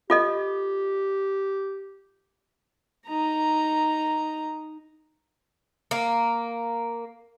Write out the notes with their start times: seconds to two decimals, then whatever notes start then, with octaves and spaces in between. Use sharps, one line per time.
0.10 F4 G4 A4 D#5
3.07 D#4 A#5
5.91 A#3